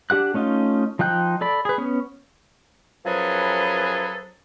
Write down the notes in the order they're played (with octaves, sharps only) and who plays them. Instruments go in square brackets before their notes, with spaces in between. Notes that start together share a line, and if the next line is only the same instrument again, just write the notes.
[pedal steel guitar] D4 G4 F#5 F#6
A3 C#4 D#4 F4
F3 D#4 G5 F#6 G6
A4 D5 B5
G#4 B4
B3 C#4
[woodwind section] F#2 F3 F#3 G#4 A4 B4